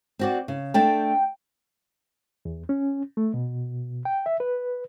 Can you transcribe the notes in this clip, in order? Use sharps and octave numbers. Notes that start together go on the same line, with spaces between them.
C4 F#4 D5
C#3
A3 D4 A4 G5
E2
C#4
A3
B2
G5
E5
B4